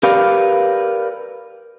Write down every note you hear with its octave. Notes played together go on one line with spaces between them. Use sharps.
G4 A#4 B4 D5 F5